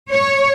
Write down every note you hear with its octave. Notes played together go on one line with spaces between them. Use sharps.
C#5